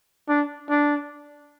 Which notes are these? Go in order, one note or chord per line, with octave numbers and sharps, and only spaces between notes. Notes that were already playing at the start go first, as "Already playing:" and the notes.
D4
D4